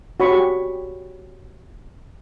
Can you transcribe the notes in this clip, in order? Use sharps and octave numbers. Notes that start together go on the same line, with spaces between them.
F#4 C#5 B5 C#6
G4